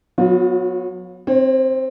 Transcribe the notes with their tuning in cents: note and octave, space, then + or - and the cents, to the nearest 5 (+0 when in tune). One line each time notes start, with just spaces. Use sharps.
F#3 -20 B3 +5 F4 +35
C4 +5 C#5 -40